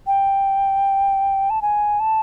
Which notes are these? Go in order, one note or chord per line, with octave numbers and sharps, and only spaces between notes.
G5
A5
G#5
A5